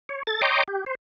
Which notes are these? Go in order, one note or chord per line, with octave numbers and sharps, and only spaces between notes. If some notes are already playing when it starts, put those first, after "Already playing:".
C#5
A4 A6
C#5 D#5 G5 A#5 C6 D6
G4
C5